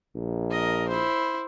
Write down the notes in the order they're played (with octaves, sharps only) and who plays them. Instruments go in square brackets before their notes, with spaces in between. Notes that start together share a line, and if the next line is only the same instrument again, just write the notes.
[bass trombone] A#1
[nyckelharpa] A#4 D#5
E4 C5